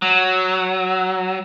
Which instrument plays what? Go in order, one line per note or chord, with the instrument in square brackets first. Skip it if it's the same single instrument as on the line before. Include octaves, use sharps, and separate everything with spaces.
[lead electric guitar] F#3